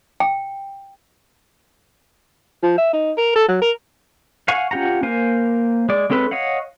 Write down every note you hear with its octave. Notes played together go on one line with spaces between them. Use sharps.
G5
F3
E5
D#4
A#4
A4
F#3
A#4
F5 F#5 G#5 C#6
C#4 F4 G4 F#5 A#5
A#3 A#4 C5 F5 G#5
G#3 D5
G#3 C4 C#4 A4 B4
C#5 D#5 F5 F#5